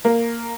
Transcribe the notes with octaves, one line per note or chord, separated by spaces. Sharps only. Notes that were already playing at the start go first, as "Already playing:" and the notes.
A#3